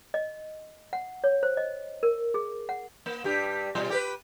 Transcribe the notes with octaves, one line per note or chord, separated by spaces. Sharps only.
D#5
F#5
C#5
C5
D#5
A#4
G#4
F#5
A#3
G2 G3 G4
B2 G3 F4
G4 A#4 B4